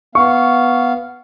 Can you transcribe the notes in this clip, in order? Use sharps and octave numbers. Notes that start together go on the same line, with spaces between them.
B3 F5 C#6